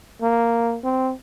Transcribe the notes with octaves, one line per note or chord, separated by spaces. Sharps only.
A#3
C4